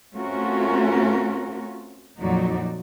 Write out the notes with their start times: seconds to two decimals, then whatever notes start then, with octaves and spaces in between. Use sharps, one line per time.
0.14 A3 C4 C#4 F4 F#4 A#4
2.20 F2 A#2 F#3 D#4 F#4 D5